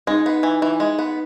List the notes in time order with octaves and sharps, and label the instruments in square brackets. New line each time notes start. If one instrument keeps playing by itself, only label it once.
[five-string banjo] G#3 [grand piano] D#4
[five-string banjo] B3
E3
E3
G#3
B3